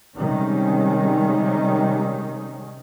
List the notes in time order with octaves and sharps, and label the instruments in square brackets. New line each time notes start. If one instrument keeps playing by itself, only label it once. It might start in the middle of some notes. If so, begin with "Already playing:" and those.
[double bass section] C3 D#3 G3 G#3 C#4